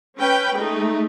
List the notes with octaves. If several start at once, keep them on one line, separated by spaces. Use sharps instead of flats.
C#4 B4 G5
G#3 A3 D#4